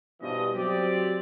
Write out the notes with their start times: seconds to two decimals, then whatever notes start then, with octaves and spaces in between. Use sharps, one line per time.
0.21 G2 B2 E3 F3 D4 D#5
0.55 F#3 C4 G4 D5